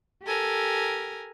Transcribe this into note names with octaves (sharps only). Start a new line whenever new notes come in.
G4 A4 A#4 G#5